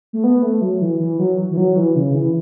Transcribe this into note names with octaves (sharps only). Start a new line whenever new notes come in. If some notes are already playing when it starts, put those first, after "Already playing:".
A3
B3
A3
F#3
E3
E3
F#3
E3
F#3
E3
C#3
E3